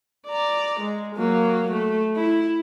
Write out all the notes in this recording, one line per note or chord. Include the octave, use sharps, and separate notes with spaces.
D5 A#5
G#3
F#3 A#3
A3
E4